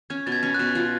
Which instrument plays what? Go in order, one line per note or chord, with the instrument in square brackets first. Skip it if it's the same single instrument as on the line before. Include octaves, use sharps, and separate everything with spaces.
[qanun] C#4 [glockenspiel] G#6
[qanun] B2 [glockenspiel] A6
[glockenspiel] G#6
[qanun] C#4
[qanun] B2 [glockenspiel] F#6
[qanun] F4